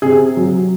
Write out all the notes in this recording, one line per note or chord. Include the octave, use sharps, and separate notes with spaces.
C3 G#4
F#3